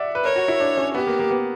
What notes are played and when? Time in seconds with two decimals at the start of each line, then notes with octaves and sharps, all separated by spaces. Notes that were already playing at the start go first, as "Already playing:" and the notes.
Already playing: D5 E5 F#5
0.15 B4
0.24 A#4 C#5
0.36 F#4
0.48 E4
0.60 D4
0.77 C#4
0.95 B3 G4
1.07 A#3
1.19 A#3
1.31 B3